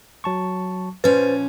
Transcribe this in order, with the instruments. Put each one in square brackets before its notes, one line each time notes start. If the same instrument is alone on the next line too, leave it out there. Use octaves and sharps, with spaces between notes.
[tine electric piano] F#3 A5 C#6
[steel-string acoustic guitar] A#2 F3 C#4 [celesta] B4 [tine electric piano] C5 A6